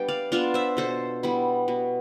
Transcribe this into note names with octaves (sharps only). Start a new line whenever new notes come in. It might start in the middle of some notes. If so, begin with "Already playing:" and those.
Already playing: G3 B3 D4 B4 G5
D5 F5
B3 D4 F4 D5 F5
C5 E5
B2 A4 C5
G3 B3 E4
B2